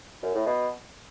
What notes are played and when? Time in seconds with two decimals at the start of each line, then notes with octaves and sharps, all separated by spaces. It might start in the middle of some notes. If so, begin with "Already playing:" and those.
0.23 F#2
0.34 A2
0.46 B2